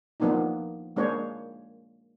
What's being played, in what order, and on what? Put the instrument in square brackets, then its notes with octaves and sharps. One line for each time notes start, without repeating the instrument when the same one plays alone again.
[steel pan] F3 A#3 B3 D4 D#4
G#3 A#3 D4 G#4 C5 C#5